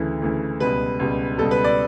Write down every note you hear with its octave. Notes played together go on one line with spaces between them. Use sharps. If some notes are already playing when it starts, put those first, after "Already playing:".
Already playing: D2 C#3 E3 A3
D2 C#3 E3 A3
C#2 B2 G3 B4
C#2 B2 G3
C#2 B2 G3 A4
B4
D5